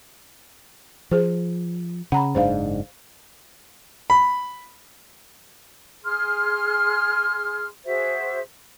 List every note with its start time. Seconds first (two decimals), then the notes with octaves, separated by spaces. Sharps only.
1.11 F3 G#4 C5
2.12 C#3 F#5 A#5 B5
2.35 F#1 G#2 D4 C5 F5
4.10 B5
6.04 G#4 C6 F6
7.85 F#4 G#4 C5 E5